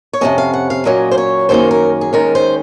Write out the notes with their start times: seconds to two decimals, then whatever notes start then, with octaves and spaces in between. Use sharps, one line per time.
0.13 C#5
0.21 F2 C3 F#3 A#3 C#4 D#5
0.38 F5
0.54 F#5
0.70 F5
0.85 A#2 F#3 A#3 C#4 D#5
1.11 C5
1.18 C#5
1.49 F#2 D#3 A#3 C#4 C5
1.71 A#4
2.01 G#4
2.13 D#2 D#3 G#3 C#4 A#4
2.35 C5